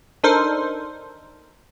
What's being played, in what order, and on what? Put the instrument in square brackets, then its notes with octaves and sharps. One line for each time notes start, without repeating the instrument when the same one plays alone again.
[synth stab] D4 D#4 A4 A#4 C5